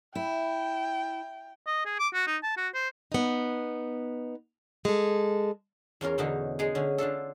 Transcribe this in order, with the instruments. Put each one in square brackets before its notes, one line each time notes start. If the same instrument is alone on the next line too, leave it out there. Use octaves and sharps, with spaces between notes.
[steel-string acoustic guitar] E4 [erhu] G5
[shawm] D#5
G#4
D6
F#4
D#4
A5
F#4
C5
[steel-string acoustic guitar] B3 D#4
G#3 A4
[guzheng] E2 C#4 F4 A#4
E2 B2 D3 C#4 D#4
G#3 D#4 G#4
D3 C#4
D3 D4 F4 A4